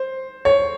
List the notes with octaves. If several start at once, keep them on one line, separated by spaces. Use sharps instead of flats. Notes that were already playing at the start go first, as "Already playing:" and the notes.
Already playing: C5
C#5